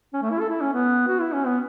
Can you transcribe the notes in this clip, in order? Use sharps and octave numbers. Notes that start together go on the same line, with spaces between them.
C#4
A3
E4
A4
E4
C#4
B3
F#4
E4
C#4
B3